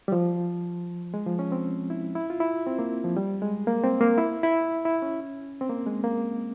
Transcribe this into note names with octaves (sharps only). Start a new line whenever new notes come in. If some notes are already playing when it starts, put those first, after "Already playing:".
G3
F3
G#3
F3
C#4
C4
E4
E4
F4
E4
C4
A#3
F3
G3
G#3
A#3
C4
A#3
E4
E4
E4
C#4
C4
A#3
G#3
A#3